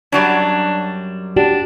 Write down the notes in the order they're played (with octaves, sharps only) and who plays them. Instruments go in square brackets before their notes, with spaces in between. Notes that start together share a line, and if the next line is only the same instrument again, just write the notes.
[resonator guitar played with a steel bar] F#2 F#3 G3 [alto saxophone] D4
[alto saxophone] D4 [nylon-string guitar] F#4 G4